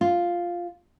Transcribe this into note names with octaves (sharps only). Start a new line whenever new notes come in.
F4